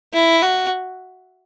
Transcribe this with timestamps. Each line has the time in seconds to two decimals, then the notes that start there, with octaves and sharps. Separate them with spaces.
0.14 E4
0.42 F#4